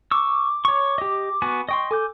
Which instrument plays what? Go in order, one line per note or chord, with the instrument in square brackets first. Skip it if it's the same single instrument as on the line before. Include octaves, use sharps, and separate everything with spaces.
[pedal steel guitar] C#6 E6 [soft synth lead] D6
[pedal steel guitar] C#5 C#6
G4 D#5
B3 F#4 G#5
[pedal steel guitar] D#5 G5 C6 [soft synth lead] C#6
[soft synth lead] A4 [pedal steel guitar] G#5 D6 G6